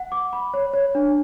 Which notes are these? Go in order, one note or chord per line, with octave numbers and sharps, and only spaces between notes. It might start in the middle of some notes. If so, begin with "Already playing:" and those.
Already playing: F#5
D6
B5
C#5
C#5
D4